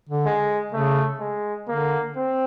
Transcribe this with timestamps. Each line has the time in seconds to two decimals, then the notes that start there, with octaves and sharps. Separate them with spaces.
0.09 D3
0.26 G#3
0.73 C#3 A3
1.20 G#3
1.68 D3 A#3
2.16 C4